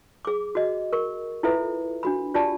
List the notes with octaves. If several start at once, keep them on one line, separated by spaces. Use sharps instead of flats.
G#4 D6
F#4 D#5
A#4 C#6
E4 F4 A4 B4 E5
D4 F#4 B5
D4 F4 G4 D5 A5